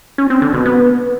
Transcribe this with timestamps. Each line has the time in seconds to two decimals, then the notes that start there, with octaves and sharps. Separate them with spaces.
0.18 C#4
0.30 C4
0.42 D3
0.54 B2
0.66 B3